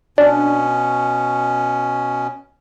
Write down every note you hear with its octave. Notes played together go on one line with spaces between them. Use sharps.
B2 C#4 D4